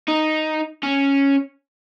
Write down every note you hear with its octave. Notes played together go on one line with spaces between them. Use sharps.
D#4
C#4